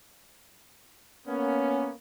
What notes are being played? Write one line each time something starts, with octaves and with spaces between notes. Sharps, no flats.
A#3 B3 C#4